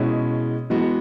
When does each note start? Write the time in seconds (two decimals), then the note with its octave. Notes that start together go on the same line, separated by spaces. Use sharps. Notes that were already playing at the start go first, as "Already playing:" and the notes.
Already playing: B2 G#3 C#4 E4 G#4
0.70 E3 G#3 B3 F#4